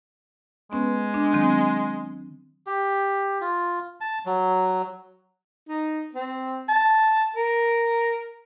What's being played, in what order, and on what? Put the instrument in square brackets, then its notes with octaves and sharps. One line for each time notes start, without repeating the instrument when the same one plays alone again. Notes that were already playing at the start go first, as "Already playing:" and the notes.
[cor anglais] G#3 [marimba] B3 C#4 B4
[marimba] D4
D#3 F#3 C4
[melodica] G4
F4
A5
F#3
[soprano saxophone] D#4
C4
A5
A#4